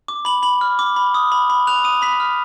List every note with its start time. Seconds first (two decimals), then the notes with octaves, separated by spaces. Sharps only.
0.08 D6
0.25 B5 F#7
0.43 B5 F#7
0.61 F6
0.79 D6
0.96 B5
1.14 D#6
1.32 B5
1.50 B5
1.67 F#6 F7
1.84 D#6 D#7
2.02 B5 B6
2.20 F6